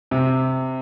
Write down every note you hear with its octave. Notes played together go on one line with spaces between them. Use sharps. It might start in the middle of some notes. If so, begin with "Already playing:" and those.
C3